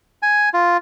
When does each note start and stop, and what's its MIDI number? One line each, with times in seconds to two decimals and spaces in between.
0.22 0.49 80
0.54 0.77 65